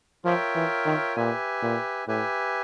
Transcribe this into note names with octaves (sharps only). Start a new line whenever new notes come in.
F3 F4 A#4 C#5 E5 G5
E3
D#3
A#2 G4 B4 E5 G#5
A#2
A2 G4 B4 E5 G#5